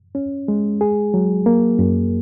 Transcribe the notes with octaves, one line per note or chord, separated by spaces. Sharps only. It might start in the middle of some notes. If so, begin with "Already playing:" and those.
C#4
G#3
G#4
F#3
A#3
F#2